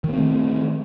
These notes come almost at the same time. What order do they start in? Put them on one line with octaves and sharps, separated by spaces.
D#3 A#3 C4 A3